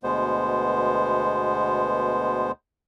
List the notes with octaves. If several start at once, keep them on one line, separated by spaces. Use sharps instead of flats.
D2 B2 G#3 B3 C5